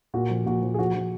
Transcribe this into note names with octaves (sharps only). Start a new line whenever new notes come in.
A#2 F#4
F3
A#2 F#4
F3
G#4
F3 F#4
F3